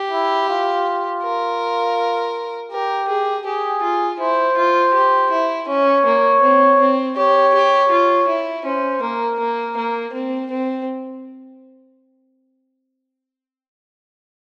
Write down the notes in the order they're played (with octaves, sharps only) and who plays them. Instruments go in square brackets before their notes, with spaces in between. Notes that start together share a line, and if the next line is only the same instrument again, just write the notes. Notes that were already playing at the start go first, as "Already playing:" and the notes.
Already playing: [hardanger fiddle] G4
[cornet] E4
F4
[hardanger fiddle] A#4
[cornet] G4 [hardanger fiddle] A#4
[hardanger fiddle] G#4
[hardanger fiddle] G4 [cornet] G#4
[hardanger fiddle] F4
[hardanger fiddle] E4 [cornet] C5
[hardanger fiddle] F4
G4
E4
[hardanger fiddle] C#4 [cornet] C#5
[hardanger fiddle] A#3
C4
C4
[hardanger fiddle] G4 [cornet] C#5
[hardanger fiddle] G4
F4
E4
[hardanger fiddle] C#4 [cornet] C5
[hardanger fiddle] A#3 [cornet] A#4
[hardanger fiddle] A#3
A#3
C4
C4